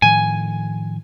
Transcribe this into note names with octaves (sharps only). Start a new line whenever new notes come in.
A2 D#3 F3 G#5